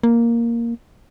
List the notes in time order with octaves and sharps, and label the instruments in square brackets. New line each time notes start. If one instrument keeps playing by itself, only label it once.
[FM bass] A#3